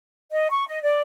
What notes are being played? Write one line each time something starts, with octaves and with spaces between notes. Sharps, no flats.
D#5
C#6
D#5
D5